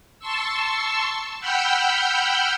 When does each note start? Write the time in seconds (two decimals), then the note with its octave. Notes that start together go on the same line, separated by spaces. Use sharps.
0.19 A5 C6 C#6 E6
1.40 F#5 G5 B5 E6 F6 G6